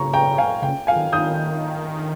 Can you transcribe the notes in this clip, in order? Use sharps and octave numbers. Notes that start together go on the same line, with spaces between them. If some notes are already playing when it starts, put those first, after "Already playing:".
Already playing: C#3 A#5 C#6
G5 A#5
F5 G#5
C#3 G5
F5 G#5
D#3
D#3 D#6 G6